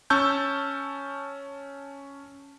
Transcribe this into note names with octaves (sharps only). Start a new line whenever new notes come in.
C#4 A5 C#6 E6 G6